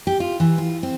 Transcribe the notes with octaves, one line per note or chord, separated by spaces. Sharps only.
G4
F4
E3
F4
C4